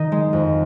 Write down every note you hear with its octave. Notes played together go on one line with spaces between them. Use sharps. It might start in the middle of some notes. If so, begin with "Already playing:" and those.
Already playing: D#3 D#4
G#3
F2